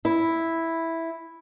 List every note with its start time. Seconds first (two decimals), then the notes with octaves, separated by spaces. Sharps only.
0.05 E4